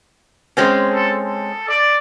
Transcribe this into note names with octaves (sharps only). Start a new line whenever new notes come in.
G#3 C4 C#4
A4
A4
D5